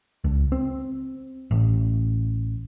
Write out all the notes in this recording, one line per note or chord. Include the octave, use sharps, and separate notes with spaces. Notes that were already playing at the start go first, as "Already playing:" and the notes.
C#2
C4
A1